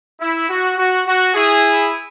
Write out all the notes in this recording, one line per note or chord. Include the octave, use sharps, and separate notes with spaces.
E4
F#4
F#4
F#4
E4 G#4